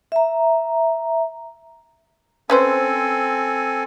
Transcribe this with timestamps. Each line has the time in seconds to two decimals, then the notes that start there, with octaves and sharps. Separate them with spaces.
0.12 E5 A#5
2.50 C4 C#4 A4 B4 C5 G#5